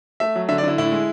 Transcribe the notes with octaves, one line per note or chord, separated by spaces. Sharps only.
A3 E5
F#3
D3 E5
D5
D3 E4
A2 E4
G#3